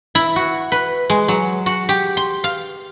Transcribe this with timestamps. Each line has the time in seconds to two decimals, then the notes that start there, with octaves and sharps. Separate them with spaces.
0.15 E4
0.36 F#4
0.72 B4
1.10 G#3
1.28 F#3
1.66 F#4
1.89 G4
2.17 C6
2.44 F5